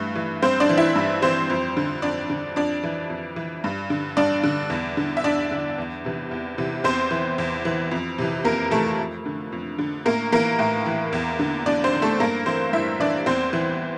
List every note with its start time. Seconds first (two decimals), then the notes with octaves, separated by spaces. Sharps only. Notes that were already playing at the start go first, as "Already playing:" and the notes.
Already playing: G2 E3 A3
0.15 E3
0.42 G2 C4 C5
0.60 D4 D5
0.69 E3
0.78 E4 E5
0.96 G2
1.22 E3 C4 C5
1.49 F2
1.77 D3
2.02 F2 D4 D5
2.30 D3
2.56 F2 D4 D5
2.83 E3
3.09 F2
3.36 E3
3.64 G2
3.90 D3
4.17 G2 D4 D5
4.43 D3
4.70 E2
4.97 D3
5.17 E5
5.24 E2 D4 D5
5.51 D3
5.78 E2
6.05 C3 E3
6.31 E2
6.58 C3 E3
6.84 E2 C4 C5
7.11 E3
7.38 E2
7.65 E3
7.91 F2
8.18 C3 E3
8.44 F2 A#3 A#4
8.71 C3 E3 A3 A4
8.98 F2
9.26 D3
9.52 F2
9.78 D3
10.05 A2 A#3 A#4
10.32 E3 A#3 A#4
10.59 A2
10.86 E3
11.13 E2
11.39 D3
11.66 E2 D4 D5
11.84 C4 C5
11.93 D3
12.02 A3 A4
12.20 G2 A#3 A#4
12.46 E3 C4 C5
12.73 G2 E4 E5
13.00 E3 D4 D5
13.26 E2 C4 C5
13.53 E3